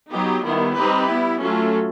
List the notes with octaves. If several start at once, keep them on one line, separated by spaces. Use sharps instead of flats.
F#3 B3 D#4 G4
D#3 G3 B3 E4
G3 C4 D#4 G4 B4
G3 B3 E4
F#3 A3 C#4 F4 A4